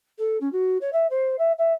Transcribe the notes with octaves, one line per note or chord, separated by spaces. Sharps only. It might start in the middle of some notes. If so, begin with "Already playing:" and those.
A4
C#4
F#4
C#5
E5
C5
E5
E5